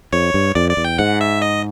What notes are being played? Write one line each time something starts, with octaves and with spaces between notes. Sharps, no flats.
F2 C#5
G2
F2 D5
D5
E2
G5
G#2 F#5
E5
D#5